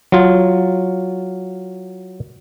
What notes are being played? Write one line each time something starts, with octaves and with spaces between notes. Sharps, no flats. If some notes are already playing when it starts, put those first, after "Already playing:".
F#3 F4